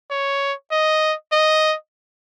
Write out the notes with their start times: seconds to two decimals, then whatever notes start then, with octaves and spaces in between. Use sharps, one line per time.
0.11 C#5
0.72 D#5
1.32 D#5